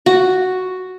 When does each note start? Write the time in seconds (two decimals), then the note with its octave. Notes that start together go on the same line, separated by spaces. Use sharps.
0.06 F#4